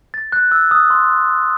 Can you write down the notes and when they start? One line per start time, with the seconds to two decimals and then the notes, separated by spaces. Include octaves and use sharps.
0.14 A6
0.32 F#6
0.51 E6
0.71 D#6
0.90 C6